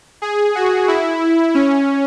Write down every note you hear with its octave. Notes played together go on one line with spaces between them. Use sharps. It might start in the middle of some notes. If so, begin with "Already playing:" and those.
G#4
F#4
E4
C#4